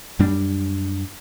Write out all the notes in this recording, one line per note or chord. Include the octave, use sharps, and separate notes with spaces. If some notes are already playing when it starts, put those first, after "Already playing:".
F#2 G3 D4